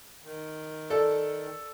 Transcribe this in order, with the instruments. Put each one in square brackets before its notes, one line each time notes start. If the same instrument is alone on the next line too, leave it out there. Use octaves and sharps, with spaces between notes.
[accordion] D#3
[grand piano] A4 D5